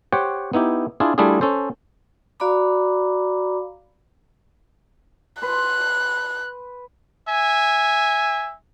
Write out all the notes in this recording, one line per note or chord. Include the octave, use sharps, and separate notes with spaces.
G4 C5 C#5 F#5 G5
B3 D#4 E4 G4
D4 E4 F4 G#4
G3 A3 D4 E4 F4 G#4
C#4 A4 C5
F#4 D5 F5 A#5 B5 D6
B4 C6 F#6
E5 G#5